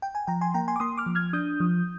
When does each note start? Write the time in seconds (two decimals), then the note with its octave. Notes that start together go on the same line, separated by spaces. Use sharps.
0.02 G5
0.15 G#5
0.27 F3 G5 A#5
0.41 G#5 C6
0.54 A#3 G5 A#5
0.68 G#5 C6
0.76 D6
0.80 A#3 C6 D#6
0.97 D6 F6
1.06 F3
1.15 F6 G#6
1.33 D4 D#6 G6
1.60 F3